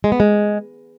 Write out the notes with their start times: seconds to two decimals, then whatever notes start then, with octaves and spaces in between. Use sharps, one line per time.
0.04 G#3
0.12 B3
0.20 G#3